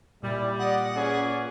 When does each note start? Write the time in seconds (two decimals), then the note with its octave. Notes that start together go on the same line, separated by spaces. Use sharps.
0.23 A#2 G3 E4
0.58 D5 D#5 F#5
0.96 C#4 G#4 B4 D5